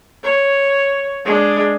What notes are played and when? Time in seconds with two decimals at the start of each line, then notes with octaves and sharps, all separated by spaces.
0.24 C#5
1.25 G#3 D4